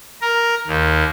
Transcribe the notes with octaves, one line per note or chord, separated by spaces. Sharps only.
A#4
D#2